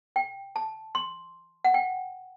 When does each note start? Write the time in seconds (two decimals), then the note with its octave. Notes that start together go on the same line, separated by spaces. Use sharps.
0.16 G5
0.56 A5
0.95 C6
1.65 F#5
1.74 G5